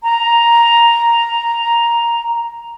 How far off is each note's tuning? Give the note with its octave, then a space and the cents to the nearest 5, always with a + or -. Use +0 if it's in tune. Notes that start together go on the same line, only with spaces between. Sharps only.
A#5 +5